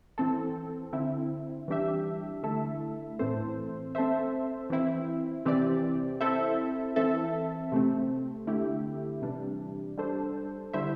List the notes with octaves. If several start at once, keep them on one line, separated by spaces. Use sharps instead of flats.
E3 C4 A4
D3 C4 E4
E3 G3 D4 G4 E5
D3 A3 E4 A4 E5
A2 E3 C4 A4 C5
C4 A4 C5 E5
E3 C4 E4
C3 E3 C4 G4 D5
C4 E4 A4 C5 E5
E3 C4 A4 E5
C3 A3 C4
D3 A3 E4 G4
C3 E3 G3 D4
G3 D4 A4 C5
D3 G3 E4 C5 E5